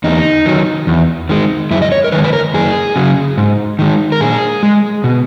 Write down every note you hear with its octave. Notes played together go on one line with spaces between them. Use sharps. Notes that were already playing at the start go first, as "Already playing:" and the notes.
E2 D#4
D#3 F#3
E2
D#3 G#3
F#2 E4
D#5
C#5
A#4
D#3 G#3 B4
B4
A#4
F#2 G#4
C#3 F#3
G#2
D#3 G#3
A#4
A#2 G#4
G#3
B2